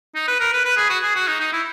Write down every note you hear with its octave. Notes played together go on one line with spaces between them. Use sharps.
D#4
B4
A#4
B4
B4
G#4
F#4
G#4
F#4
D#4
D#4
E4